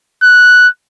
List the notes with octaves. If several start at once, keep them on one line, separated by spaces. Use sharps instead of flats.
F#6